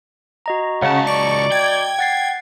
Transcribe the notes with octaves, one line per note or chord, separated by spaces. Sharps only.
F#4 D#5 A#5
C#2 C#3 F#5 A5
D5 C#6
G5 G#6
F#5 A6 C7